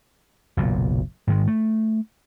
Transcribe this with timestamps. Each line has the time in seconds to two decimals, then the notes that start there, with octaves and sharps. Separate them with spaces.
0.57 F#1 B1 A#2
1.27 G#2 D#3 G#3
1.47 A3